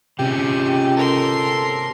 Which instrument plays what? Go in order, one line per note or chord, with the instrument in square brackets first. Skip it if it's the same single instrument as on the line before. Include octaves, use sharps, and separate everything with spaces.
[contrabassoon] C#2 [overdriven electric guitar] C3 C#4 [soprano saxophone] G4
[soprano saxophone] A4 [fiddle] A#4 C6